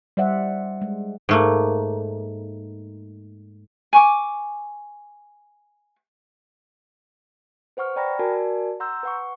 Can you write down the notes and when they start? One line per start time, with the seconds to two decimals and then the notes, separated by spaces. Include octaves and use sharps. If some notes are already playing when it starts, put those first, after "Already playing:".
0.17 G3 C5 D5 E5 F#5
0.82 G#3
1.29 G#2 A3 A#3
3.93 G#5 C#6 D6
7.77 B4 C5 F#5 C#6 F6
7.96 D5 G5 A#5 B5 F6 A#6
8.19 F#4 A#4 D5 G#5 A5
8.80 F#5 A#5 C6 E6 G6
9.03 B4 F#5 C#6